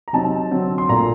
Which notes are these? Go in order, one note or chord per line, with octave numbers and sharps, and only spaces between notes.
A#5
C3 F#3 C4 D#4 A5
D3 F#3 C4
C6
A#2 A3 D4 A#5